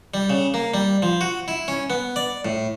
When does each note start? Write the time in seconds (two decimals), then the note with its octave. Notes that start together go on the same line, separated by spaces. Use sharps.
0.14 G3
0.30 C#3
0.54 A#3
0.74 G3
1.02 F3
1.21 F#4
1.48 E4
1.68 C#4
1.90 B3
2.16 D5
2.45 A2